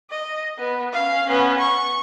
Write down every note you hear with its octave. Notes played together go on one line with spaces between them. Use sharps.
D#5
B3
C#4 F5
B3 C#4
C#6